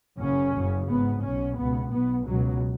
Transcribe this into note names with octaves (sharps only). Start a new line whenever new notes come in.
F#1 F#2 C#3 C#4
F#1 F#2 C#3
G#1 G#2 B3
B1 B2 C#4
C#2 B2 B3
B1 B2 B3
C#2 B2 F#3